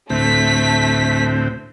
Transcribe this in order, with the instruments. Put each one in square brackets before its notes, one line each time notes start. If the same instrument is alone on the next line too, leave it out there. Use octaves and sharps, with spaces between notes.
[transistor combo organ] D2 A2 C4 [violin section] A3 B6